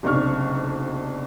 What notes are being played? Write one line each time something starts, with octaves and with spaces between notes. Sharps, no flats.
F#1 B1 C3 D4 C#6 F6